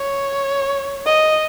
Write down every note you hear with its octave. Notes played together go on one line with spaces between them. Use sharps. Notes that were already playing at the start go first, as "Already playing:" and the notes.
Already playing: C#5
D#5